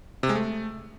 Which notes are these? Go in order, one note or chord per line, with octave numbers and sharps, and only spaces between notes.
C3
G#3
A3